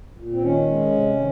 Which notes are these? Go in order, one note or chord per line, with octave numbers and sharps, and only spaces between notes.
A#2
C4
D#3 C#4
G#3
C3
D#3